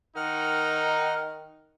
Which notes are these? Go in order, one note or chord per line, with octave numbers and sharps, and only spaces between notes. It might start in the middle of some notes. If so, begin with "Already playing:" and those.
D#3 D#4 A#4 F#5 F6